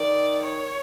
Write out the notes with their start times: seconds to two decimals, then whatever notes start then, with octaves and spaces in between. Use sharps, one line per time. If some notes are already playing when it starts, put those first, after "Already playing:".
Already playing: D#3 D5
0.42 C#5